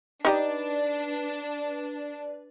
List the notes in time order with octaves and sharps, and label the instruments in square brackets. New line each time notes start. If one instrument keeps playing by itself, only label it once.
[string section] D4 [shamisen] D#4 G4 D#5 [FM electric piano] B4 D5